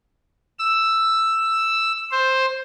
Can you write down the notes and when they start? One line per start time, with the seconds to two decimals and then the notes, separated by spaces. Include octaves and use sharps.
0.59 E6
2.11 C5